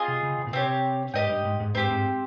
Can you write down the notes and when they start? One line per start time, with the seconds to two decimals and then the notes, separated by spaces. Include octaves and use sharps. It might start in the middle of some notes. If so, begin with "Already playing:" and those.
Already playing: C4 F4 G#4 D#5
0.08 C3
0.23 C#3
0.38 C#3
0.47 A#2
0.53 C3 C4 G4 C#5
1.14 G#2 G4 A#4 D#5 G5
1.29 G2
1.45 G#2
1.60 G#2
1.75 G#2 C4 G4 C5
1.90 G#2